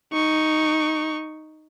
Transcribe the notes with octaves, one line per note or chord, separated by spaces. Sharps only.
D#4 C#6